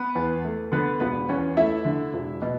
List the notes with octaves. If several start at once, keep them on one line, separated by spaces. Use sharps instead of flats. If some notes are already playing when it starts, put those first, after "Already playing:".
Already playing: B3 B4
E2
A3
D3 B3 B4
E1 B3 B4
E2 C#4 C#5
A3 E4 E5
D3
E1
B2